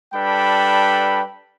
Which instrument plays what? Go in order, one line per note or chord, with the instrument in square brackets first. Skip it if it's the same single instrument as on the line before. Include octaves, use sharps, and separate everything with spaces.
[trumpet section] G3 D4 A4 B4 G5 B5